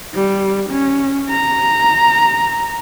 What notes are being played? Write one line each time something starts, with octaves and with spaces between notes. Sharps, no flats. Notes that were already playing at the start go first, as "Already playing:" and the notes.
G3
C#4
A#5